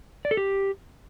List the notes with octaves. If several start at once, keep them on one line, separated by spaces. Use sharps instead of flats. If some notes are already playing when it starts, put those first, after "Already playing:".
D5
A4
G4